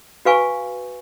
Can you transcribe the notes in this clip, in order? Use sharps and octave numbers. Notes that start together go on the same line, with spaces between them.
F#4 B4 F5 G#5 C#6